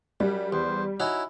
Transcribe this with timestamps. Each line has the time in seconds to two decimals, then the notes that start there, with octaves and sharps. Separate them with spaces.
0.20 F#2 G3
0.52 E2 C5
1.00 C#4 D#4 E4 F#4